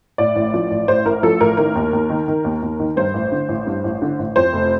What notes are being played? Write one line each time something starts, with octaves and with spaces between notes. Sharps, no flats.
A2 D5
A1
F3
A1
A2 C5
A1 A#4
F3 A4
A1 A#4
D#3 A#4
D#2
D#2
D#3
D#3
D#2
D#2
D#3
G2 C5
A1
D3
A1
G2
A1
D3
A1
F2 C5
F1